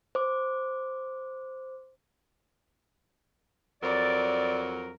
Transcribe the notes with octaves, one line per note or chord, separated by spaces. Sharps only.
C5 D6
F2 F#3 A#4 D5